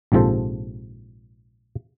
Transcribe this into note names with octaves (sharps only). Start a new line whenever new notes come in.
A#1 G#2 C3 F3 A4 C5